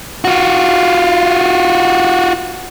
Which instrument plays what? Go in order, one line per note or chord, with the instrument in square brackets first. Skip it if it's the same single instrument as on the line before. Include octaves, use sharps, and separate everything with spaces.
[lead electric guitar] F4 F#4